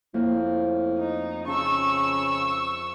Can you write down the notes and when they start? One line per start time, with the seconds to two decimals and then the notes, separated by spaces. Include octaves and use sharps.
0.14 F2 A2 A#3
0.99 D#4
1.48 C#3 A5 A#5 C#6 E6